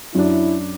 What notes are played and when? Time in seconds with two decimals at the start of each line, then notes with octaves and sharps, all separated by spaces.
0.14 F#2 F#3 D4 E4